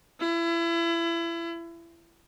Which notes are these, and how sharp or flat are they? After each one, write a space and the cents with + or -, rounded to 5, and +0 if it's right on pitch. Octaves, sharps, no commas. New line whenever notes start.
E4 +30